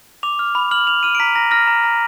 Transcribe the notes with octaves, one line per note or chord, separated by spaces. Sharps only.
D6 F7
F6
B5
F6 F#7
F6 F7
F6 D#7
D7
A#5 B6
A#5 A#6
F6 A#6
A#5
A#5